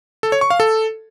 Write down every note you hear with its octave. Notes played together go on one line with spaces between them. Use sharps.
A4
C#5
C#6
F5
A4